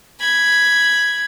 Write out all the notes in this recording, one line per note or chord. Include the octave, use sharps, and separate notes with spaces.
B5 G#6